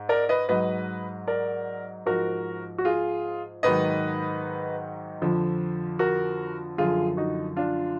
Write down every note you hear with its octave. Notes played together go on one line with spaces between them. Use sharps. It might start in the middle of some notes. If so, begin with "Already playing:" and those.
Already playing: G#2
A#4 D5
B4 D#5
G#2 F#3 B4 D#5
A#4 D5
G#2 F3 F#4 A#4
F#4
F4 G#4
G#2 D#3 F#3 B4 D#5
F2 D3 F3
F#4 A#4
F#2 D3 F3 F4 G#4
D#4 F#4
D4 F4